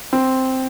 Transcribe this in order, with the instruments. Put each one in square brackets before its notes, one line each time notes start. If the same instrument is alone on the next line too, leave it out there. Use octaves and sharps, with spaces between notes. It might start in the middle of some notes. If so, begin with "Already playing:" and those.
[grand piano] C4